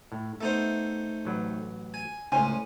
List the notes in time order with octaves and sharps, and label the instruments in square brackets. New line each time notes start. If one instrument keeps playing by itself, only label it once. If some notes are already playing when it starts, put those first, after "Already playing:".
[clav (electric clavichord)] A2
[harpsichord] A3 D#4 C5 [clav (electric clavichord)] B3 E5
[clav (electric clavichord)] A1 F#3 B4
[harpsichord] G#5
[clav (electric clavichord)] C#2 C5 [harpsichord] A2 C#4 [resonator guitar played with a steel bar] G#5